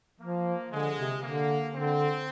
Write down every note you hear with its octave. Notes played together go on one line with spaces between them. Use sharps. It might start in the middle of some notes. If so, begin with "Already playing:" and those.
F3 A#3
D3 G#3
C3
D3 A#3
D3 C4